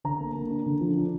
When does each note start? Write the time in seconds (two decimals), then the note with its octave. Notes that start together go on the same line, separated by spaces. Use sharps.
0.04 D3 A#5
0.20 A#3
0.35 A#3
0.51 D4
0.66 D3
0.81 F3
0.97 D4